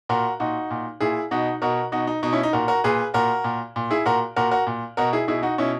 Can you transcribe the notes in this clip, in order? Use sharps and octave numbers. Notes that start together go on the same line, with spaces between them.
A#2 F#4 A#4
A#2 D#4 F#4
A#2
A#2 E4 G#4
B2 D#4 F#4
B2 F#4 A#4
B2 D#4 F#4
D#4
B2 D#4
C#4 E4
D#4
A#2 F#4 A#4
F#4 A#4
A#2 G#4 B4
A#2 F#4 A#4
A#2
A#2
E4 G#4
A#2 F#4 A#4
A#2 F#4 A#4
F#4 A#4
A#2
B2 F#4 A#4
E4 G#4
B2 E4 G#4
D#4 F#4
B2 C#4 E4